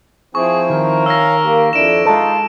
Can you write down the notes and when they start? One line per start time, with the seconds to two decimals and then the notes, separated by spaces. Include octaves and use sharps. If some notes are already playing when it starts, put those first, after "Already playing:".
0.35 F3 C4 E4 G#4 C#6
0.70 D#3 A#4
1.06 C#5 F5 G#5 E6 A#6
1.44 A#3 G4
1.73 F2 D4 E4 D7 E7
2.05 G#3 D#4 F4 A4